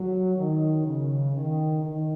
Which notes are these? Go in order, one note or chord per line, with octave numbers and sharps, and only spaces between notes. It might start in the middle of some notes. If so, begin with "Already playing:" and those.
Already playing: F#3
D#3
C#3
D#3
D#3